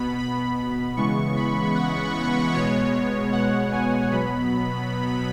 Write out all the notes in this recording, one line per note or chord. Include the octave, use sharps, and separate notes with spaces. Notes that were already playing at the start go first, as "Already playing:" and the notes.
Already playing: B2 B3 B5
B5
C#3 E3 G#3 B3 C#6
B5
F#5
B2 G#3 B3 C#5
F#5
G#5
B2 F#3 B3 B5